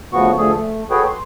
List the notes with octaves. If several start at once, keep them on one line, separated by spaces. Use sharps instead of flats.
D2 C#3 F3 B3 F#4 C#6
D2 D3 F3 A3 G#4 A4
A3
F#4 G#4 A4 B4 C#5 G5
C6